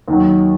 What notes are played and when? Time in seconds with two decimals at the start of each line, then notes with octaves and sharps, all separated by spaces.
0.08 D#2 D#3 F#3